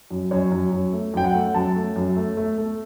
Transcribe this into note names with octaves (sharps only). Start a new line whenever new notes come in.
F#2
F#2 C#5
F#2
F#2
A3
F#2 G5
F#5
A3
F#2 A5
A3
F#2
A3
A3
A3